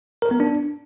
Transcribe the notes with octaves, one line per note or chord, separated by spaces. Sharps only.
A#4
B3
D4